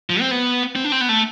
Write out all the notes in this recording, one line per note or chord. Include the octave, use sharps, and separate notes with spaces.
F3
C4
B3
C4
D4
C4
B3
A3